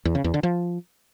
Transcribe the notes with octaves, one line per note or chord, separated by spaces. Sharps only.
E2
C#3
E2
D3
F3